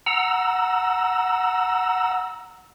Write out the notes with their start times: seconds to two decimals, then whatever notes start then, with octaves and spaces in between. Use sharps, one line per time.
0.06 F#5 A#5 E6